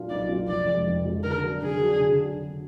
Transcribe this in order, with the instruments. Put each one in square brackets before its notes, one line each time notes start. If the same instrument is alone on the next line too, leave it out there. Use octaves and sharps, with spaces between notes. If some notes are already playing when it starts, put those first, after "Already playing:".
Already playing: [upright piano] A#2 F#3 D4 F4
[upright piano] B1 [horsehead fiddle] D5
[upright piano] A#2 F#3 D4 F4
[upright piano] F1 [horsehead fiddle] D5
[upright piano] F2 F3 G#3
F1
F2 F3 G#3
[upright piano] D3 [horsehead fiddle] A#4
[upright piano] F#3 D4
[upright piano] D3 [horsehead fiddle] G#4
[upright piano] F#3 D4
D3
F#3 D4
D3